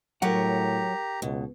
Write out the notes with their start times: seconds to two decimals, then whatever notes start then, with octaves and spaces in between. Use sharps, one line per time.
0.22 A2 F#3 G4 A#4 C#5 F#5 A#5
1.22 C#2 B2